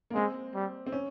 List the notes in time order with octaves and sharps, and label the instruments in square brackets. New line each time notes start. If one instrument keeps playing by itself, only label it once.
[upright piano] A#3
[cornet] G#3 [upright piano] C4
[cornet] G3
[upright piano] C4
C#4